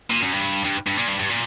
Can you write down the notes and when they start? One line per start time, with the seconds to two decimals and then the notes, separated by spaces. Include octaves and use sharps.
0.10 A#2
0.21 F#2
0.33 G2
0.65 G2
0.87 G2
0.97 A#2
1.08 G2
1.20 G2
1.30 A#2